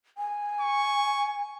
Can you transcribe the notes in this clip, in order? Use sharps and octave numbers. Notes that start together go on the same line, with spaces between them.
G#5
C#6